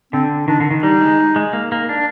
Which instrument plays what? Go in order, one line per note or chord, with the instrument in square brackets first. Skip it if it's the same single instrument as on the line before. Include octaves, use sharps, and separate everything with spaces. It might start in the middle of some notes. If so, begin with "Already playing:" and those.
[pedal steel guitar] D3 [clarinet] C4
[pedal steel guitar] D#3 [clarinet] D4
[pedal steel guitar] D3
D#3
[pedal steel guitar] G3 [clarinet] D#4
[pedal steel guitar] G#3
G#3
A#3
A#3
D4